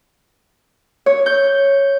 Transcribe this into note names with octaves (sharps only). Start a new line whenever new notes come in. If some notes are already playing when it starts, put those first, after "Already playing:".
C#5
G6